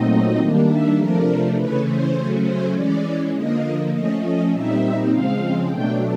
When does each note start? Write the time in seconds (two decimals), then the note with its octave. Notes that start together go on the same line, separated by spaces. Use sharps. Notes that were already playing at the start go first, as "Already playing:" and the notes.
Already playing: A#2 F#3 A3 C4 D#4 D#5
0.38 D#3 G3 A#3 D4
0.68 E5
0.97 C3 F3 A3 D4 A#4
1.56 C#3 E3 A3 C#4 B4
1.85 C5
2.14 C#3 F#3 A3 C#4
2.44 C5
2.73 E3 G#3 C#4 D5
3.32 D3 F3 A#3 D#5
3.92 F3 A3 C#4 D#5
4.21 D#5
4.51 A#2 G3 C4 D#4 E5
5.09 C#3 F3 G#3 C4 F5
5.68 B2 F#3 A3 D4 G5